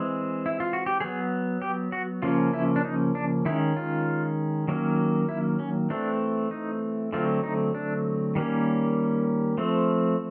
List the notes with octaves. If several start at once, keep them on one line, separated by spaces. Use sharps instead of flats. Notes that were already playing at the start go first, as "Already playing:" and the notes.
Already playing: E3 G#3 C4
E4
F4
F#4
G4
F#3 B3 G#4
G4
F#4
C#3 F3 A#3 C#4 F4
E4
D4
D#4
D4
D#3 G#3 C#4 E4
F4
D#3 F#3 A#3 C#4
E4
C#4
E3 A3 C4 D4
D#4
D3 F#3 A3 C4 F4
D#4
D4
D#3 G3 A#3 C#4
F3 A3 C4